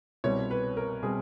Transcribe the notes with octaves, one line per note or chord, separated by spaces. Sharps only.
C2 B2 G3 C4 C#5
B4
A#4
B2 G3 C4 G#4